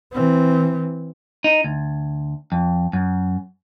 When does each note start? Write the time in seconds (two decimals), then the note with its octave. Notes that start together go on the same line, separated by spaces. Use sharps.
0.13 E3 C4
1.44 D#4
1.64 D2
2.52 F2
2.93 F#2